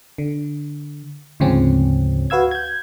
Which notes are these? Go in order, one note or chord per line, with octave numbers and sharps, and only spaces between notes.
D3
D2 G#2 C#3 F3 C4 C#4
F#4 B4 F5 E6 G#6
G6 G#6